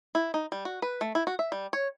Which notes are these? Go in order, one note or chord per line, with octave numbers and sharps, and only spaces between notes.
E4
D#4
G3
F#4
B4
A3
E4
F#4
E5
G3
C#5